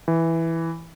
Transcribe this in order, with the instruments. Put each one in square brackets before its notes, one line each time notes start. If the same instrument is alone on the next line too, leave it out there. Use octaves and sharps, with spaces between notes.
[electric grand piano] E3